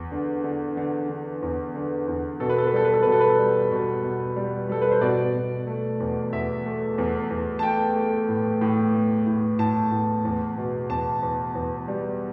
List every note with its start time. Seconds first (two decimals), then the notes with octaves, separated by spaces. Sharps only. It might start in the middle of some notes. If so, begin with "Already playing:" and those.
Already playing: E2
0.11 D3
0.44 D3
0.77 D3
1.09 D3
1.42 E2
1.75 D3
2.08 E2
2.40 B2 A4
2.49 B4
2.58 A4
2.67 B4
2.73 G3 A4
2.85 B4
2.94 A4
3.03 B2 B4
3.12 A4
3.20 B4
3.30 A4
3.39 G3
3.71 B2
4.04 B2
4.36 G3
4.69 G3 A4
4.82 B4
4.91 C5
5.01 B2 D5
5.34 B2
5.67 A3
6.00 E2
6.32 E2 E5
6.65 A3
6.98 E2
7.30 E2
7.59 A5
7.63 A3 G5
7.96 A3
8.29 A2
8.61 A2
8.94 A3
9.27 A2
9.59 A2 A5
9.92 A2
10.25 E2
10.57 B2
10.90 E2 A5
11.23 E2
11.55 E2
11.88 G3